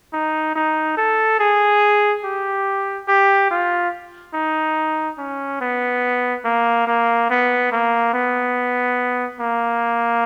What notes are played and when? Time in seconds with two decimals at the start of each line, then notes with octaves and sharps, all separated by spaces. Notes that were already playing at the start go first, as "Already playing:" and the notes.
0.13 D#4
0.55 D#4
0.97 A4
1.40 G#4
2.24 G4
3.08 G4
3.51 F4
4.34 D#4
5.18 C#4
5.61 B3
6.45 A#3
6.87 A#3
7.30 B3
7.72 A#3
8.14 B3
9.40 A#3